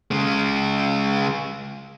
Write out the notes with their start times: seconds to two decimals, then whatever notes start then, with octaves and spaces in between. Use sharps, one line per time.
0.11 C#3 G#3